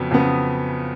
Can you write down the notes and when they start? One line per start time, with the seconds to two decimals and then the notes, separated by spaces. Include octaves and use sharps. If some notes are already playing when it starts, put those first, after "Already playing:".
Already playing: F2 C#3 F#3 B3
0.11 F2 C#3 F#3 B3